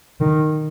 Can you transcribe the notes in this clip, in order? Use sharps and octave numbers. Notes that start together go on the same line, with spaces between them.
D#3